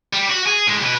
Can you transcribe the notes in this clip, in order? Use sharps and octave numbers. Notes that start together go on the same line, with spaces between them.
G3
F#4
G#4
A2 G#3
B2 B4